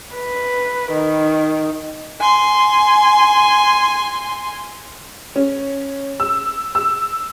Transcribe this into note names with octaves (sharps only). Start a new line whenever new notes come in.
B4
D#3
G#5 C6
C#4
E6
E6